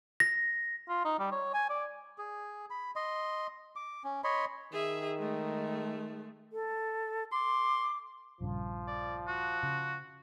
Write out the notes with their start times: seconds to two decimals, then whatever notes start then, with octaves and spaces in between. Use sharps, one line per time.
0.20 A#6
0.89 F4
1.05 D#4
1.19 G3
1.32 C#5
1.54 G#5
1.70 D5
2.18 G#4
2.70 B5
2.96 D#5 C6
3.76 D6
4.04 C#4
4.24 C#5 D#5 B5 C6
4.72 D#3 G#4 E5
5.18 G#3 A3
6.52 A4
7.32 C6 D6
8.41 A#1 G2 C#3 F3
8.88 D5
9.28 F#4
9.63 C#3